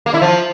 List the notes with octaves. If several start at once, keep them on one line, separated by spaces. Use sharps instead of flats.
A#3
E4
F3